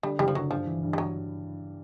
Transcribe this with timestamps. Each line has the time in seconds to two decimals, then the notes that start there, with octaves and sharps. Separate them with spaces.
0.03 D3 G3
0.19 F#1 G3
0.28 F3
0.35 D3 F#3
0.51 G2 F3
0.67 E3
0.83 G2
0.93 G3
0.98 F#3